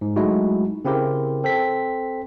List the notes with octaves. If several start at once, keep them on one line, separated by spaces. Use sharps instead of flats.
G#2
F#3 G#3 A3 D#4 E4 F#4
C#3 C4 E4 G4 A#4
C4 A4 B6